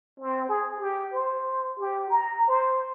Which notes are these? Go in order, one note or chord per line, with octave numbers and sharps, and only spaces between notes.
C4
G#4
G4
C5
G4
A#5
C5